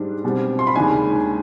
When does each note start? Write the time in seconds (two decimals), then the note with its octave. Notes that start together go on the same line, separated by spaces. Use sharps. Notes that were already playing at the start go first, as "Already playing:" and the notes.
Already playing: G#2 G3 D4
0.24 B2 G3 C4
0.59 C6
0.67 B5
0.76 D#2 D#3 G#3 D4 G#5